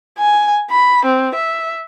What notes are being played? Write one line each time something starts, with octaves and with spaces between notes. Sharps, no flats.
G#5
B5
C4
E5